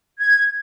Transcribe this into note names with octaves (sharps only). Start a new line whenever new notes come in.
G#6